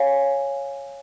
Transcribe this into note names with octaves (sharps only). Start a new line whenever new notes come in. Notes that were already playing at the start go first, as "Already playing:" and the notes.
Already playing: C#5 F5 G#5